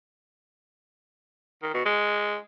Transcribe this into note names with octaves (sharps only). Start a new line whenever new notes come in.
D#3
B2
G#3